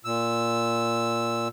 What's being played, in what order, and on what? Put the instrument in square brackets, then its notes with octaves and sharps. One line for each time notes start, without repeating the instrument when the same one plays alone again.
[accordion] A#2 E6